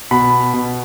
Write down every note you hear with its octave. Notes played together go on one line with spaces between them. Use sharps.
B2 B5
B2